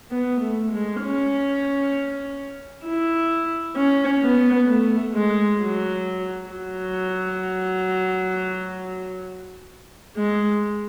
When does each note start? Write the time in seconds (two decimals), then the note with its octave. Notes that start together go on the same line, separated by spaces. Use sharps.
0.11 B3
0.41 A3
0.72 G#3
1.03 C#4
2.85 E4
3.76 C#4
4.23 B3
4.67 A3
5.14 G#3
5.60 F#3
6.50 F#3
10.17 G#3